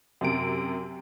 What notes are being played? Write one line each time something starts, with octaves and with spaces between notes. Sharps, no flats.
F#2 C3 D7